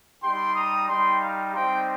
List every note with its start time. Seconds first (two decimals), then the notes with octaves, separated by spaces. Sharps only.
0.22 G3 D#4 G4 G5 C6
0.55 A#5 D#6
0.88 G3 D#4 G4 G5 C6
1.21 F5 A#5
1.53 G3 C4 D#4 G4 G5 C6